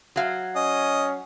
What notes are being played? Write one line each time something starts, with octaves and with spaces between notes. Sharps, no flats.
F#3 F5
C#4 D#5